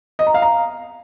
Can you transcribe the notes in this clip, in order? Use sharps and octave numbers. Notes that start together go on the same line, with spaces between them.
D#5
A#5
F5
A#5